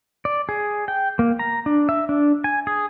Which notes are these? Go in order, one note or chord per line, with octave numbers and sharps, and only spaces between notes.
D5
G#4
G5
A#3
A#5
D4
E5
D4
G#5
G#4